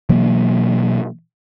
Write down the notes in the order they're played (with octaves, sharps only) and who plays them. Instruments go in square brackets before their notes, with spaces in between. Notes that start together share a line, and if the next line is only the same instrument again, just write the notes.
[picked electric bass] B2 E3 F#3 A#3